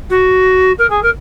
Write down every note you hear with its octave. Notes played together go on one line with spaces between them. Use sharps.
F#4
A#4
G#4
A#4